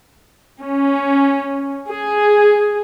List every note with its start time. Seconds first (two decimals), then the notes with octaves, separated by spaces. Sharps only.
0.62 C#4
1.90 G#4